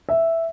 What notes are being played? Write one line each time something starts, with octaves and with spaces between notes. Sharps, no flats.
E5